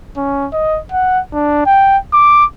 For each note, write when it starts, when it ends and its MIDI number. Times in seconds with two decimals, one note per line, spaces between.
0.17 0.48 61
0.53 0.79 75
0.92 1.20 78
1.33 1.66 62
1.66 1.97 79
2.13 2.45 86